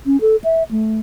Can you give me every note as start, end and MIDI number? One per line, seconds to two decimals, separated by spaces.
0.06 0.20 61
0.21 0.36 69
0.44 0.63 76
0.71 1.00 57